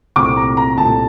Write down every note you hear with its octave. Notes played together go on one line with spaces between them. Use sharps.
C2 A#2 A3 C4 D6
A#5
A#5
C2 A#2 A3 C4 A5